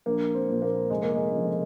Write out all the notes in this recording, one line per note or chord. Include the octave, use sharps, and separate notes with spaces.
A#1 A#3
C4
A#2 F3
A#3
F1 G#3
A#3
G#3
F2 C#3 F3